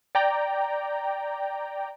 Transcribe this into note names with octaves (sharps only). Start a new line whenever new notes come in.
D5 G5 A#5